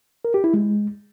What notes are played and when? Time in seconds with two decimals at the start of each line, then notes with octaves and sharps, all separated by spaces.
0.25 A#4
0.34 G4
0.44 E4
0.54 G#3